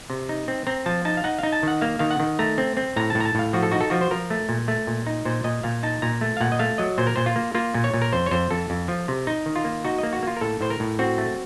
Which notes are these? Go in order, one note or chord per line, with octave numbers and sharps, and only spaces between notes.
C3
D#4
C4
C4 A#5
F3 A5
D#4 A5
F5
D#4 F#5
D#4 F5
A5
D#3 F#5
A#3 F5
D#3 F5
F#5
D#3
A3 A#5
C4
C4
A2 A#5
A2 A5
A#5
A5
A2 F5
F3 F#4
A4
D#4 F#4
A4
F3 F#4
C5
F3 A#4
A3
A#2
A3
A#2
D#4
A#2 C5
A#2 D#5
A#2 F5
D#4 A5
A#2 A#5
A3
F5
A#2 F#5
D#5
A3 F5
F#3 D#5
A#2 C5
A#4
A#2 C5
F4
A#3
A#3 F4
A#2
C#5
A#2
A#4
F2 C5
C#5
F2 C5
F2 A4
F2
F3
C3
D#4
D#3
F4
A#3
D#4 F#4
A#3 D#5
F#4
A#3 F4
A#4
A2 A4
A2 C5
A#4
A2
C4 F#4
A3